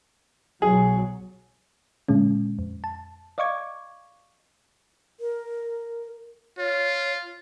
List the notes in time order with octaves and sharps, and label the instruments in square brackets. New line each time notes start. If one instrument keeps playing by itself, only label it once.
[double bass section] B1 F#3 [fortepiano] G#4
[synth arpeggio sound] A#2 D3 G#3 C#4
F2
A5
D5 D#5 F5 C#6 D6 G#6
[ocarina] A#4
[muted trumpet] F4 [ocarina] C#5